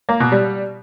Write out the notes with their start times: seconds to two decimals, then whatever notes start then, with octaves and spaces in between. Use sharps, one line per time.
0.09 A#3
0.20 B2
0.32 G3